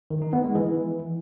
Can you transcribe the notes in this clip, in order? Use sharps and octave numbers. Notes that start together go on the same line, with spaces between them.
D#3
D#4
B3
G#3
E3